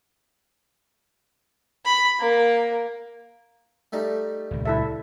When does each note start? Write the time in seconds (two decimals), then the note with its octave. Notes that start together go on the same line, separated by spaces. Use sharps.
1.85 B5
2.20 A#3
3.92 G3 A3 D#4
4.51 D#1 C#2
4.65 E4 A4 E5